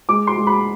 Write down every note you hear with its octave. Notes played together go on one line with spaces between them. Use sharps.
G#3 D6
C6
G#3
B5